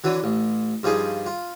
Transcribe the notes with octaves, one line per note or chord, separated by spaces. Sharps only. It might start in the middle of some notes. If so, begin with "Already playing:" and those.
D3 E3 F#3
A1
G2 F3 D#4 G#4
F4